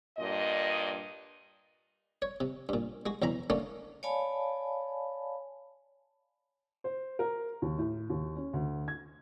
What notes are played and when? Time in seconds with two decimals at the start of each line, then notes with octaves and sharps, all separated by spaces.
0.17 G2 A#2 D#5
2.22 C#5
2.40 C3
2.69 G2 A#2
3.06 G#3 F#4
3.22 B1 E2 E3 A#5 B5
3.50 D3 A3 A#3 C#4
4.03 C#5 D5 F5 G#5 A5 B5
6.84 C5
7.19 A#4
7.62 D#2
7.78 A2
8.10 D#2
8.36 C#4
8.53 D2
8.88 G#6